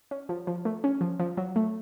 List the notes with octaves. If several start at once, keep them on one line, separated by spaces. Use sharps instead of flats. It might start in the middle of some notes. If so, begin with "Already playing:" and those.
C#4
F3
F3
A3
C#4
F3
F3
F#3
A3